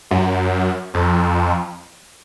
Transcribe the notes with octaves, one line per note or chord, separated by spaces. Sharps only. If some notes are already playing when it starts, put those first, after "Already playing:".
F#2
F2